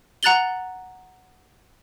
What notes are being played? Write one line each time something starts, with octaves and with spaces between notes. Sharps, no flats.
F#5 A#5 F#6 A6 F#7 G7